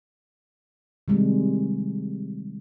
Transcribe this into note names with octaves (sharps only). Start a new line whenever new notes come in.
C3 D#3 G3 G#3